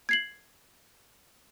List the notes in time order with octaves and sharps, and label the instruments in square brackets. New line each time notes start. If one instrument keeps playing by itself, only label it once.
[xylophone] G#6 C7 F#7